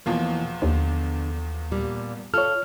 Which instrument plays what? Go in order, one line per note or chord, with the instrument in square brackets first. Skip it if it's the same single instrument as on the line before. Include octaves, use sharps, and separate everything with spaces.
[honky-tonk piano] E2 F3 F4 [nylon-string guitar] B2 E3 A#3
[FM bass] D#2 [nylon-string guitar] D3
[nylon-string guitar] A#2 G3 A#3
[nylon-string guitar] F4 A4 [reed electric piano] C#5 F6